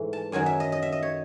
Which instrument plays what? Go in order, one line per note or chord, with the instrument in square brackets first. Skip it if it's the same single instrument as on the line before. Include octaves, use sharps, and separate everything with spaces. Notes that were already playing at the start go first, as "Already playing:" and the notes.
Already playing: [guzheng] G#2 E3 A3
A5
F#2 D#3 F#3 G#5
E5
D#5
D#5
E5
D#5
C#5